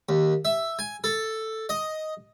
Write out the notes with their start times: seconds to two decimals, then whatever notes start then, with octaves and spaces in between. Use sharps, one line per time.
0.09 D#2
0.45 E5
0.79 G#5
1.04 A4
1.69 D#5